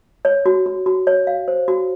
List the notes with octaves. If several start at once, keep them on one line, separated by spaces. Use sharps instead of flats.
C#5
F#4
F#4
F#4
C#5
F5
C5
F#4